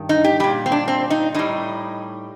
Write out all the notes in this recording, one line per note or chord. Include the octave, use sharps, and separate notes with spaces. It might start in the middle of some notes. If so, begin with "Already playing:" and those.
Already playing: G2 D#3
D#4
G4
A#2 G3 G4
C4
D4
C4
D#4
A2 G3 D#4